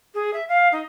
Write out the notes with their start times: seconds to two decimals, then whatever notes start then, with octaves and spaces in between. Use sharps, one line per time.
0.14 G#4
0.33 E5
0.48 F5
0.72 D#4